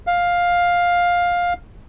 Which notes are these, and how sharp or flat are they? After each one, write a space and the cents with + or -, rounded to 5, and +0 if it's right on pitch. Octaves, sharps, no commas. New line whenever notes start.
F5 +10